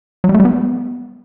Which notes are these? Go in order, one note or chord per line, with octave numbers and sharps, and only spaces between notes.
F#3
G3
A3
G3
B3